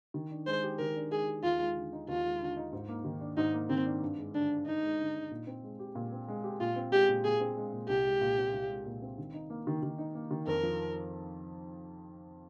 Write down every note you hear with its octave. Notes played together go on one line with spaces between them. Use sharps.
D#3
D4
G#3 C5
G4
D#3 A#4
D4
G#3 G#4
G4
D#2 F4
G#3
D3
D#4
D#2 F4
G#3
D3
D#4
G#2
A#3
D#3
D4
G#2 D#4
A#3
D#3 C4
D4
G2
G#3
D3 D4
D4
G2 D#4
G#3
D3
D4
A#2
C4
G#3
G4
A#2
C4
G#3
G4
A#2 F4
C4
G#3 G4
A#2
A#2 G#4
C4
G#3
A#2
C2 G4
G#3
A#2
C4
C2
G#3
A#2
C4
D#3
D#4
A#3
D#3
D#3
D#4
A#3
D#3
F2 A#4
F3